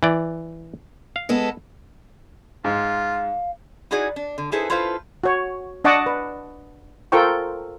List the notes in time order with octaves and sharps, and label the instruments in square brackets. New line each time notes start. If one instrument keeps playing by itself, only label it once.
[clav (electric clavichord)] E3 D5
F5
[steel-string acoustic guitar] G#3 B3 A4
[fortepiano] G#2 [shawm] F4 [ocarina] F5
[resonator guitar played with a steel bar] D#4 E4 F#4 G#4 D5
D4
D3
D#4 E4 G#4 A4 B4 C5
E4 F4 A4 B4 C5 F5
[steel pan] F#4 C#5
D4 D#5 F#5 A5 C#6 D6
B4
F4 A4 A#4 C5 G5 C#6